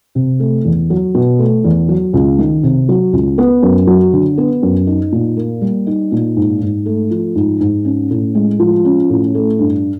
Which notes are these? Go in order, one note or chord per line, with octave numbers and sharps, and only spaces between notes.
C3
A3
E2
F#3
B2
A3
E2
F#3
C#2
D#3
C3
F#3
C#2
B3
F#2
F#3
D3
B3
F#2
D#4
A#2
A#3
G3
D#4
A#2
G#2
G#2
A3
F3
G#2
G#2
C#4
A2
G#3
F3
C#4
A2
A3
G2